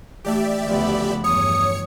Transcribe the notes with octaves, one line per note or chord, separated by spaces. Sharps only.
E3 A3 D#4 G4 D5 E5
D2 C#3 F3 B3 B5
E2 G2 C#5 D#6 C#7